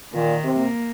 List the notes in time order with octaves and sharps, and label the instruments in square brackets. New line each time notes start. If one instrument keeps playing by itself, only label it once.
[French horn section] A#2 [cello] D#3
[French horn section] C3
[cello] A#3